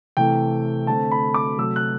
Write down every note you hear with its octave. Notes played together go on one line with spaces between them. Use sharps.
C3 E3 A3 G5
D3 A3 C4 A5
B5
D6
C3 F#3 A3 E6
F#6